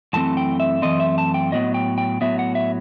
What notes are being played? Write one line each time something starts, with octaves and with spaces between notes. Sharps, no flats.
F#2 E3 A3 C4 A5
G5
E5
F#2 E3 A3 C4 D#5
E5
A5
G5
A2 F#3 B3 D#5
G5
G5
A2 F#3 B3 E5
F#5
E5